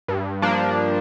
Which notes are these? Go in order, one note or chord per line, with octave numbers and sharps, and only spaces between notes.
G2
F3 A#3 D4